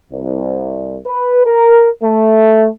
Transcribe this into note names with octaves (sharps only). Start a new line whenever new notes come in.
C2
B4
A#4
A3